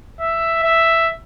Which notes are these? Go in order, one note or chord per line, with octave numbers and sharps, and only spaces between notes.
E5
E5